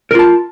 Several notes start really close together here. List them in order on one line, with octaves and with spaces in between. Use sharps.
A#4 F4 A5